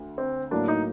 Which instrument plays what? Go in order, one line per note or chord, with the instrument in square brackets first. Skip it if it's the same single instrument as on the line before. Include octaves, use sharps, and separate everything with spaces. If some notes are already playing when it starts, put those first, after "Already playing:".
Already playing: [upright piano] D2
[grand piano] C4
[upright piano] A2 F#3 A#3 [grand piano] D4
[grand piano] D#4